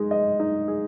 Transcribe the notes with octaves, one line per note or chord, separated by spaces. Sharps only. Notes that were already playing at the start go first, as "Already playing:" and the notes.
Already playing: G#3 D#4 G#4
D#5
D#4
G#4